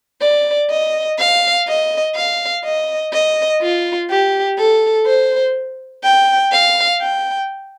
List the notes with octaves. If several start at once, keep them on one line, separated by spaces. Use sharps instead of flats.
D5
D#5
F5
D#5
F5
D#5
D#5
F4
G4
A4
C5
G5
F5
G5